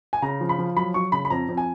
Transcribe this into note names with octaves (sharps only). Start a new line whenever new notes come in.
G#5
C#3 A#5
F3
B5
F3
F#3 B5
F#3 C#6
C#3 B5
B5
F2 A#5
F2
G#5